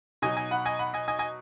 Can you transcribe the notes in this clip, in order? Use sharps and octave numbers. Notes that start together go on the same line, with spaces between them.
B2 F#3 D#4 D#5 G#5
D#5 G#5
F#5 B5
D#5 G#5
F#5 B5
D#5 G#5
D#5 G#5
D#5 G#5